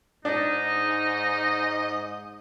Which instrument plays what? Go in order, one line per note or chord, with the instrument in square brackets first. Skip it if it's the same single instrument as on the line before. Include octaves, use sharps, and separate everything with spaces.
[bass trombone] G#2 [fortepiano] D4 [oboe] D#4 [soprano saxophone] D#5